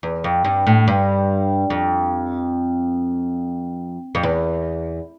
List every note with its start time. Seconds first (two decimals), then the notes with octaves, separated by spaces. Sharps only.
0.03 E2
0.24 F2
0.45 G2
0.67 A2
0.88 G2
1.70 F2
4.15 F2
4.23 E2